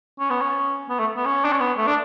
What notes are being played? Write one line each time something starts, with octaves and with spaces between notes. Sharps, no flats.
C#4
B3
C#4
B3
A3
B3
C#4
D4
C#4
B3
A3
D4